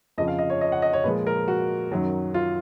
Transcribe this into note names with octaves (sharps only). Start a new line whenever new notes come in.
F2 C#3 F3 D#5
F5
D#5
C#5
D#5
F#5
D#5
C#5
A#2 F3 G#3 B4
A#4
F#4
F#2 D#3 F#3
F4